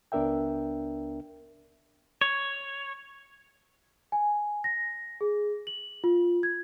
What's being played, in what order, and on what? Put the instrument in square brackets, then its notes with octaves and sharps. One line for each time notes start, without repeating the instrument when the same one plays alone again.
[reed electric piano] C#2 B3 D4 A#4 E5 G5
[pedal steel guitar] C#5
[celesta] G#5
A#6
G#4
F#7
F4
G#6